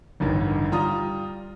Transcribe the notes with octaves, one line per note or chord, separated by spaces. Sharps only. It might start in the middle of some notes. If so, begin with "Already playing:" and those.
A1 D2 G2 D#3
G3 F4 A#5 D#6